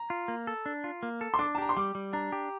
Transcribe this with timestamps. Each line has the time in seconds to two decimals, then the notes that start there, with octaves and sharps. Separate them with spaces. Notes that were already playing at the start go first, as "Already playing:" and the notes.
Already playing: A#5
0.10 F4
0.28 A#3
0.47 A4
0.66 D4
0.84 F4
1.03 A#3
1.21 A4
1.34 C6
1.39 D4 D6
1.55 A5
1.58 G4 A#5
1.69 C6
1.77 G3 D6
1.95 G3
2.13 D4 A#5
2.32 G4